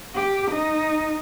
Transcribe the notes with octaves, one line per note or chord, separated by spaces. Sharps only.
G4
D#4